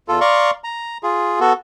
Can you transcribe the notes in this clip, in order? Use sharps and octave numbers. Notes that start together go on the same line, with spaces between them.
E2 F4 A4
D5 F5 A#5 C6 C#6
A#5
F4 G#4
B3 F#4 A4